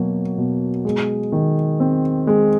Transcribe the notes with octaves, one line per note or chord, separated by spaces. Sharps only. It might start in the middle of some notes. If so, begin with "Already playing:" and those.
Already playing: B2 F#3 A#3
B2
G#3
D#3
C4
G#3